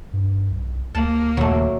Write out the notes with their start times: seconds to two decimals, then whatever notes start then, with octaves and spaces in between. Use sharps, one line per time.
0.13 G2
0.51 B1
0.95 D2 A#3 A5
1.37 A#1 D#2 F#3 A3